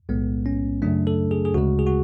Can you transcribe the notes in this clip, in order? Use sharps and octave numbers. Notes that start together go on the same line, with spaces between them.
B1 A2 G#3 B3
C#4
F#2 C#3 F#3 A3 D4
A4
G#4
G#4
D2 C#3 G#3 F#4
G#4
F#4